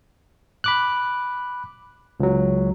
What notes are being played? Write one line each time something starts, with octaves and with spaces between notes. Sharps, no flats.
B5 D6 F#6
C#2 F#3